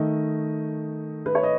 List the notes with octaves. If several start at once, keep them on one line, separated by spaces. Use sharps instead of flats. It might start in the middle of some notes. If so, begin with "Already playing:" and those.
Already playing: D#3 A3 D#5
B4
C#5
D#5